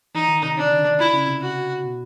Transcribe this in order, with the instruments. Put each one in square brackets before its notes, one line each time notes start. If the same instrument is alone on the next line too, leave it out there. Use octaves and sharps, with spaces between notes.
[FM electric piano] E3 [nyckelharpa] D#4
[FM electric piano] D#3
C3
[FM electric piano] C3 [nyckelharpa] D4
[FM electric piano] D3
D3
D#3
[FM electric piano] D3 [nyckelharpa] E4
[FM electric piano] C#3
C3
[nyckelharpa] F#4
[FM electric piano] B2